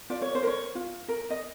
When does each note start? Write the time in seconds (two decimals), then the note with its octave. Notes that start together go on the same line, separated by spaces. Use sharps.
0.10 F4 D5
0.22 C#5
0.35 C5
0.43 A#4 C#5
0.75 F4
1.08 A#4
1.30 D#5